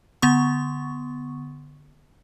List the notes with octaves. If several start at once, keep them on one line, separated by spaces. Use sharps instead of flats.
D3 B3 C#6